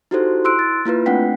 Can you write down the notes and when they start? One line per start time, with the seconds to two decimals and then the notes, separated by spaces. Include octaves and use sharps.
0.11 D#4 E4 F#4 G4 A4 C5
0.45 E4 C6 E6 F#6 D7
0.59 A6
0.85 A#3 E4 F4 B4
1.06 A3 C4 D4 F#5 G5 B6